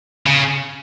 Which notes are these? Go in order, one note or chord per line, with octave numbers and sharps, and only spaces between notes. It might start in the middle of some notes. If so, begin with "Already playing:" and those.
C#3